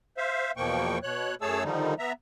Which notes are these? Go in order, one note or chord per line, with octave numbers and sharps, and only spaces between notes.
C5 E5 F5
E2 B2 F3 A#3 G5 C#6
B2 C#5 F#6
F#2 A3 G#4 C#5 A5 E6
D3 D#3 F3 G3 D#4
B3 E5 A#5